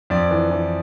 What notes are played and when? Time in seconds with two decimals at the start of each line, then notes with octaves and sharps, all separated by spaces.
0.10 F2 D5
0.31 E3
0.51 E3